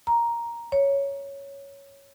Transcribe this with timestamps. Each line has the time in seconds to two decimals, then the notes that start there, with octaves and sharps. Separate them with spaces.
0.07 A#5
0.72 C#5